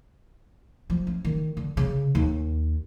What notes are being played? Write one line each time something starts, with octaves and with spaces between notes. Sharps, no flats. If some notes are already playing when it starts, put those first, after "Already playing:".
F3
C#4
D#3
D3
C#3
D#2